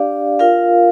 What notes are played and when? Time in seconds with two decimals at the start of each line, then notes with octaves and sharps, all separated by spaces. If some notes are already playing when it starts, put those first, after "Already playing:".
Already playing: D4 G4 D5 F5
0.39 F4 A#4 F5